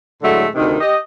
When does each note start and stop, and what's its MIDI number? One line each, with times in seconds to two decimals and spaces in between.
0.23 0.46 45
0.23 0.46 50
0.23 0.46 54
0.23 0.46 56
0.23 0.46 57
0.55 0.80 38
0.55 0.80 48
0.55 0.80 51
0.81 0.97 67
0.81 0.97 75